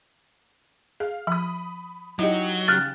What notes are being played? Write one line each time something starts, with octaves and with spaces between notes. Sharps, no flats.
G#4 F5
F3 B5 D#6
F#3 D#4 E4 G4 D#5
C#3 G4 F6 F#6 A6